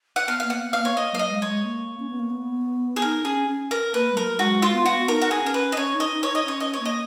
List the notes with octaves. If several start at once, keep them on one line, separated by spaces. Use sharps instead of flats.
F#5
B3 F5
A#3 F5
F#5
B3
F5
A#3
C#5
A#3 D#5
F#3 F5
D#5
G#3
C#5
G#3
A#3
C#4
B3
A#3
B3
G#4
D#4 A#4
C#4 G#4
C#4
A#4
A#3 B4
G#3
F#3 A#4
G#3 F#4
F4
B3
F#4
D#4 A#4
F#4
G#4
C#4 A#4
B4
D#5
C#4 C#5
D#4
D#5
D#4
C#5
D#4
D#5
C#4 C#5
D#5
C#5
A#3
D#5